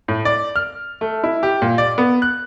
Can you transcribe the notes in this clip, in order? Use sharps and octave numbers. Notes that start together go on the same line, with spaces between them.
A2
D5
F6
A3
E4
G4
A#2
D5
B3
F#6